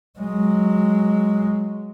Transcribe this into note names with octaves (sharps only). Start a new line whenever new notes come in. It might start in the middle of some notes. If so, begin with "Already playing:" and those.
F#3 G#3